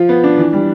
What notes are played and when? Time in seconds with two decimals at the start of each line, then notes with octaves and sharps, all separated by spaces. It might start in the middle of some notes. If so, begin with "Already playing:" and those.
Already playing: F3 F4
0.09 B3
0.24 D4
0.38 E3
0.53 G3